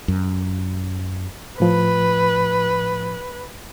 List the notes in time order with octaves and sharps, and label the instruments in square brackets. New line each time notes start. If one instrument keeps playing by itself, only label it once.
[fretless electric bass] F#2
[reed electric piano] A2 F3 [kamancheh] B4